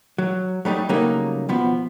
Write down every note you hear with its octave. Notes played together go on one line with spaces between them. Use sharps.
F#3
F#3 G3 A3 D#4
C#3 F#3 G3 A3 A#3 D#4
B1 F3 B3